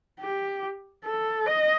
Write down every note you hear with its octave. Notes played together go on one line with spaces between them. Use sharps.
G4
A4
D#5